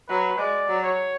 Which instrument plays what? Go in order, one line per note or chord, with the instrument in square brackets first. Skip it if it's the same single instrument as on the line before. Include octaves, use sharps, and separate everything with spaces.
[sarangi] F#3 [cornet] B4
[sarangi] G#3 [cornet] D5
[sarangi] F#3
[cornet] C#5